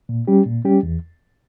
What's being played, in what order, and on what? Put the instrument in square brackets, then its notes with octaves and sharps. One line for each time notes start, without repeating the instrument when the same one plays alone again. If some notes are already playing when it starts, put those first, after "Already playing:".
[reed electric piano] A#2
G3 C#4 G4
A#2
G3 C#4 G4
E2